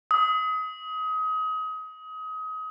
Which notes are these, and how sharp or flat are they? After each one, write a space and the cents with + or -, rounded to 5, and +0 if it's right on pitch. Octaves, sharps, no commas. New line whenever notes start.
D#6 +30